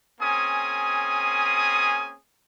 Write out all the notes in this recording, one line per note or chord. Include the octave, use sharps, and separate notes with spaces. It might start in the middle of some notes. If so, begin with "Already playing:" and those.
A#3 C4 C#4 G#4 G#5 D#6